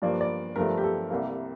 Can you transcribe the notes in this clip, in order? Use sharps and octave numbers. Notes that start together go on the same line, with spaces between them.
G2 F3 A#3 D5
D5
G2 F3 A3 A#4
G4
A4
C2 C3 G3 A#3